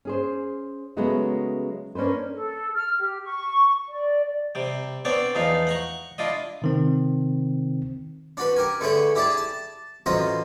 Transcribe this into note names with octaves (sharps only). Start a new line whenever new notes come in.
C#4 G#4 C5
C#3 F#3 G#3 A3 B3 C#4
A#3 C#4 D4 B4 C5
A4
F6
G4
C#6
D5
C3 G3
B3 C4 D4 C#5 D5 A5
E2 F3 D#4 F5
F#5 A#5 C#6
D4 E4 F4 D#5
C3 D#3 C4
D4 F#4 B4
G4 A#4 G#5
D3 A3 G#4 B4 C#5
E4 G4 G#4 D5 A5
A5
A1 F#3 F4 C5 D#5 A#5